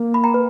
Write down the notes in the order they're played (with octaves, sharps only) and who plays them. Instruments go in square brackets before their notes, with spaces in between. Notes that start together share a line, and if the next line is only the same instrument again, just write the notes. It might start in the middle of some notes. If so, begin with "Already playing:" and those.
Already playing: [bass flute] A#3
[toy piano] B5
G5 A#5
B4